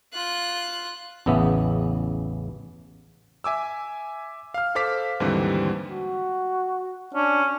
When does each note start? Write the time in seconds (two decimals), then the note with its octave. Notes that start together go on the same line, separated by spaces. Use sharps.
0.13 F4 F#6
1.26 A1 E2 C#3 B3 E5
3.44 E5 G#5 D6 E6
4.54 F5 F6
4.75 A4 C5 F5 D6 B6
5.20 D#2 G#2 D3 E3 G3 C4
5.90 F#4
7.14 C#4 D4